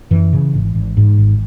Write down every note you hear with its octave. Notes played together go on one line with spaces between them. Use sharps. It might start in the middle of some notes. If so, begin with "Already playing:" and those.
F#2 E3
C#3
G#1
G#1
G#2
G#1